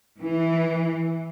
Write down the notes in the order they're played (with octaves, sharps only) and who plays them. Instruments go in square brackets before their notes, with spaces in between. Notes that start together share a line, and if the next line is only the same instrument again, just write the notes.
[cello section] E3